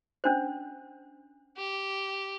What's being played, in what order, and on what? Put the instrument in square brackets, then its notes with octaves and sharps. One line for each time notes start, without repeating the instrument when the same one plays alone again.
[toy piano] C#4 D4 C5
[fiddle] G4